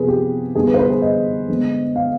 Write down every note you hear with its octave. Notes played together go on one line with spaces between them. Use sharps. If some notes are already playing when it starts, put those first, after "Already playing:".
Already playing: C3 F3 B3 G#4 B4
G4
D3 G3 B3 G#4
B4
C5
B4
G#4
D#5
D3 G#3 B3
F5